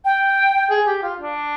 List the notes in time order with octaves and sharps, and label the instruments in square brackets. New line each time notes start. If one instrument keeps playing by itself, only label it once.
[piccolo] G5
[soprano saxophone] G#4
G4
F4
D4